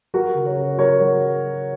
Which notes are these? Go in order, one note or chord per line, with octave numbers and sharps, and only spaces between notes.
F#3 F#4 A#4
C#3
A#4 C#5
C#3
F#3 A#4 C#5
F#3